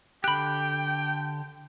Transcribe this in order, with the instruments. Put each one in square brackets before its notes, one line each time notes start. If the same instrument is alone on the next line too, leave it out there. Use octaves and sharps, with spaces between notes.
[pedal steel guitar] D3 G4 [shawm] G5 [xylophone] B5 F#6